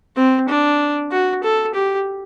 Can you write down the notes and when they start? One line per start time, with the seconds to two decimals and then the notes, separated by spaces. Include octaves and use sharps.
0.17 C4
0.49 D4
1.11 F#4
1.43 A4
1.74 G4